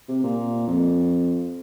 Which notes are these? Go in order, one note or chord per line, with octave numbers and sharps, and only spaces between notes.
C3
A#2
F2